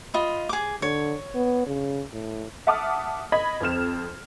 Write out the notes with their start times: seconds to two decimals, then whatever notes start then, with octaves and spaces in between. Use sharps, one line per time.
0.14 F4 D#5 B5
0.49 G#4 D6
0.82 D3 C#5
1.35 B3
1.67 C#3
2.13 A2
2.67 E5 F#5 A5 D6 D#6 F6
3.32 D#5 B5 G#6 B6
3.61 F2 C4 F6 E7